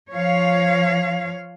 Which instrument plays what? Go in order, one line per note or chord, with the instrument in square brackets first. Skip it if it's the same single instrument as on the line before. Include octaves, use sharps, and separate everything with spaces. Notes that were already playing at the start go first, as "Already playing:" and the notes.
[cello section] F3 C#5 F5